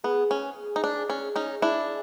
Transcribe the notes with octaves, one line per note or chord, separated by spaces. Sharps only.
B3 G#4
C#4
D#4
D4
C#4 G#4
C#4 D#4
D4 E4